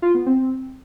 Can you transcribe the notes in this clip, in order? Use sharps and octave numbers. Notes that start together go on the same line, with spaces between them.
F4
B3
C4